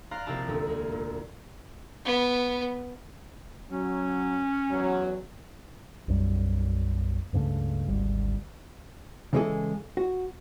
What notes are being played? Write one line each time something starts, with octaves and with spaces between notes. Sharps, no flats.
D5 F5 A#5 C6 F#6 A#6
A#1 C3 E4 G4 A5 A#5
E1 D2 A#2 E4
G#3 A#3
A#2
B3
F#3 C#4
E2 F#3
B1 F#2 G3
C#2 G2 C#3 A3
G#1 D2 G3
C#3 E3 G#3 E4 G#4 A4
F#4